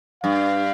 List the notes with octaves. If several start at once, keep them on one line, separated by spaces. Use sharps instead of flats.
G2 F5